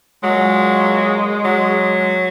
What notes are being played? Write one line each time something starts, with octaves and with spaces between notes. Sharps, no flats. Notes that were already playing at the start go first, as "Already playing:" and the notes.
A#2 F#3 G#3
F#3